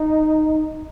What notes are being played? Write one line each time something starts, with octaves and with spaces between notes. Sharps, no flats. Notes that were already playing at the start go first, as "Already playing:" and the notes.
Already playing: D#4